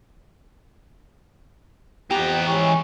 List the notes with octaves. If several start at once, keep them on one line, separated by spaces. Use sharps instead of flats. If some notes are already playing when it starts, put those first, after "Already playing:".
F2 E3 B3 G4 A#5
G#3 C#4 E4 C#6